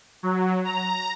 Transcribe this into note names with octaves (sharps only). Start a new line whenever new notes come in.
F#3
A#5